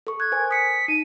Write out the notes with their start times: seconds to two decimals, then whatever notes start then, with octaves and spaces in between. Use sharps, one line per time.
0.07 A4 C#6
0.20 F#6 G#6
0.32 A#4 C5 G#5
0.51 D#6 B6 C#7
0.88 D#4 D#7